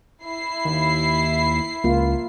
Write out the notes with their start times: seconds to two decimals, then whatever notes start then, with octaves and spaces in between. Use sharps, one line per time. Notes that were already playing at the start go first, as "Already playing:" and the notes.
0.23 E4 C7
0.65 D#2
1.84 C#2 A#3 F4